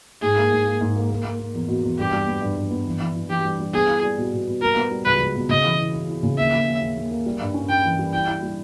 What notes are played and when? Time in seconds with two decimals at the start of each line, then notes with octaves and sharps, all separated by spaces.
0.22 G#2 G#4
0.37 A#3
0.52 G#2
0.66 A#3
0.81 G#2
0.96 A#3
1.10 A#3
1.24 A#3
1.39 A#3
1.54 E2
1.68 B2
1.84 E2
1.98 G2 G4
2.12 G3
2.27 B3
2.42 G2
2.56 G2
2.71 B3
2.86 E3
3.01 E3
3.16 E3
3.29 E3 G4
3.45 G3
3.59 G3
3.74 B3 G#4
3.88 E4
4.03 G3
4.18 B2
4.33 B2
4.47 B2
4.62 G3 A#4
4.77 B3
4.91 G3
5.05 C#2 B4
5.20 C#2
5.35 B2
5.49 C#3 D#5
5.64 E3
5.79 E4
5.93 E4
6.09 E4
6.23 C#3
6.37 D#2 E5
6.52 D#2
6.67 D#2
6.81 D#2
6.97 D#2
7.11 A#3
7.26 G3
7.41 G2
7.54 C#4
7.69 C#4 G5
7.85 E3
7.99 G3
8.13 E4 G5
8.28 E4
8.42 G3